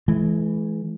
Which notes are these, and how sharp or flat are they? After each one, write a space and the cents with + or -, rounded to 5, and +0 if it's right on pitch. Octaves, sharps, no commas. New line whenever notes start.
E3 +0 G#3 +40